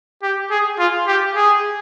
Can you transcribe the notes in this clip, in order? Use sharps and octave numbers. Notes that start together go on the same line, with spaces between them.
G4
G#4
F4
G4
G#4